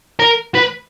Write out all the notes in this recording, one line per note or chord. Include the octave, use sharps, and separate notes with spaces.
A#4
B4